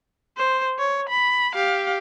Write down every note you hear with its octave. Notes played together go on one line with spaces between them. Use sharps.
C5
C#5
B5
G4 F5